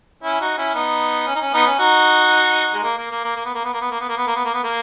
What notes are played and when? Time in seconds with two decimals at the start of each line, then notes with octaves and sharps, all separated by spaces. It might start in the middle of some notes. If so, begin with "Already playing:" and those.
0.23 C#4 E4
0.41 D#4 F#4
0.58 C#4 E4
0.75 B3 D#4
1.27 C#4
1.35 D#4
1.41 C#4
1.54 B3 D#4
1.67 C#4
1.79 D#4 F#4
2.74 G#3
2.84 A#3
2.97 A#3
3.11 A#3
3.24 A#3
3.36 A#3
3.45 B3
3.55 A#3
3.64 B3
3.73 A#3
3.81 B3
3.91 A#3
4.01 B3
4.09 A#3
4.17 B3
4.27 A#3
4.36 B3
4.45 A#3
4.54 B3
4.64 A#3